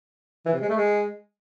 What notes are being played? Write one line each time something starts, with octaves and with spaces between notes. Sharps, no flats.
E3
C3
G#3
A3
G#3